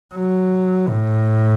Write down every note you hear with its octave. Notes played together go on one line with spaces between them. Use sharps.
F#3
A2